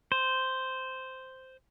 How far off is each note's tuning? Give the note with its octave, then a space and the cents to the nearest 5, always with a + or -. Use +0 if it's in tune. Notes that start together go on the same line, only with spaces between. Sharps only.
C5 -5